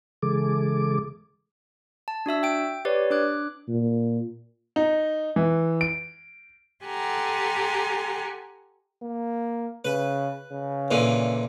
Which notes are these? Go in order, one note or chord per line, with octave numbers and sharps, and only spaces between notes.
C#3 E3 G#3 G#4 A4 D6
A5
D4 F#4 E5 E6
G5 D7
G4 B4 C#5 D5
D4 D6 F#6
A#2
D#4
E3
D7
G4 A4 F#5 G#5 A#5 C6
A#3
C#3 B4
C#3
A#2 D3 E3